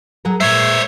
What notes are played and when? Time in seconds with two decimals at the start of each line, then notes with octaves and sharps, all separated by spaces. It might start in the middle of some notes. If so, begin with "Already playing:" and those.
0.25 F#3 G#4 A#4
0.40 A#2 G#3 C5 C#5 E5 G#6